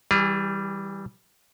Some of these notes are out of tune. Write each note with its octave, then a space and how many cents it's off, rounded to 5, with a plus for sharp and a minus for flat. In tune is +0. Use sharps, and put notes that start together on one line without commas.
E3 -15 G3 +0 G#4 -35